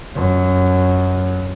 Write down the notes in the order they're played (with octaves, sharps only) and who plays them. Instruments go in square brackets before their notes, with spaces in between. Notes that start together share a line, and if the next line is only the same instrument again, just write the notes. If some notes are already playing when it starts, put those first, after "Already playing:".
[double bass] F#2